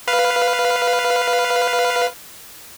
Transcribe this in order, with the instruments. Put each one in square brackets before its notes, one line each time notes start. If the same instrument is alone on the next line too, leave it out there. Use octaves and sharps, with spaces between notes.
[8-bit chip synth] B4 F5